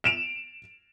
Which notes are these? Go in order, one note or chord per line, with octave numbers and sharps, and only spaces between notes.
D7 E7 F7